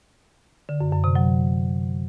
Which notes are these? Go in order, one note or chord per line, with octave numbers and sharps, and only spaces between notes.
D3
F#2
F#2
C3
F#3